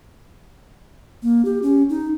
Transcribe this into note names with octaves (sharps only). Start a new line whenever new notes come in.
A#3
G4
C#4
D#4